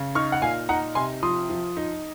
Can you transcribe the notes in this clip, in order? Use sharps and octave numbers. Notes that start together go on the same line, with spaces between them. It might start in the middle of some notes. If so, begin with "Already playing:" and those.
Already playing: C#3
D#4 C#6 F6
F#5
A#2 F5 G#5
D#4 F#5 A#5
C3 G#5 C6
F3 C6 D#6
F3
D#4